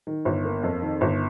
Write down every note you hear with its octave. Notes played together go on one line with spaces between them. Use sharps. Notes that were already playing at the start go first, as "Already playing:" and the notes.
D#3
G1
A#3
F2
D#3
G1